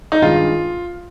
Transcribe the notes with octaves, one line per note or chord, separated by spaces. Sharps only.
D#4
G2 D#3 G#3 F4